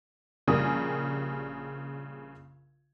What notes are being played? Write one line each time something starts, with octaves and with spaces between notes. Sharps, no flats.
A#1 C#3 G3 G#4 A#4 D#6